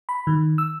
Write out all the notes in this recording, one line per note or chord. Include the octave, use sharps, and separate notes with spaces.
B5
D#3
E6